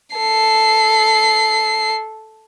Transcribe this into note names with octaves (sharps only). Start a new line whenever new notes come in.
A4 C7